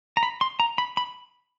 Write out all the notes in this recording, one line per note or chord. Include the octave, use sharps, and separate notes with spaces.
A#5
B5
C6
A#5
B5
B5